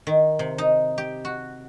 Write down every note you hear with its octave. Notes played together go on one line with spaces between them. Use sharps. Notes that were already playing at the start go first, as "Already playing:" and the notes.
D#3
C3
D#4
G4
F#4